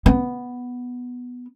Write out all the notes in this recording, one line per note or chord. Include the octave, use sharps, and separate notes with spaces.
B3